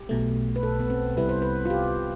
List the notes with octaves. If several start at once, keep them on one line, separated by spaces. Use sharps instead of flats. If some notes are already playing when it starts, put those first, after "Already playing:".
Already playing: G4
B1 B2 A3
B4
A4
B3
C4
C2 C3 G3 B3 E4 B4
C5
B4
F4
G4